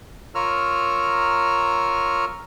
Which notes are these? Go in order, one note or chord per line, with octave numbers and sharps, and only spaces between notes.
F4 A#4 C#5 A#5 E6 F6